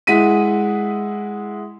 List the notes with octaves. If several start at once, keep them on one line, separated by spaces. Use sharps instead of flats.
G#3 E4 F#5 B6 D#7